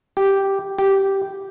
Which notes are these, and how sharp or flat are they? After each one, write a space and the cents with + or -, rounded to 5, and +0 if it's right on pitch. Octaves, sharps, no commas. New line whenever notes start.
G4 -5
G4 -10